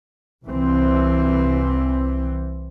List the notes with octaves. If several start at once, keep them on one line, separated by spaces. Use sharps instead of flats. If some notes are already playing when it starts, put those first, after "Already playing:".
C2 E3 C4